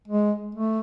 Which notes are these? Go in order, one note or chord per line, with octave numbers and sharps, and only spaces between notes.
G#3
A3